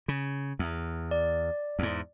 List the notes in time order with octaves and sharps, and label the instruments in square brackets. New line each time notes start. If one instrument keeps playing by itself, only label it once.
[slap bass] C#3
E2
[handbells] D5
[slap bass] E2 G#2